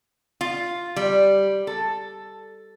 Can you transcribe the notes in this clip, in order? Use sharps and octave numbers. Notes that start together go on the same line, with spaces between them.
F4
G3
A4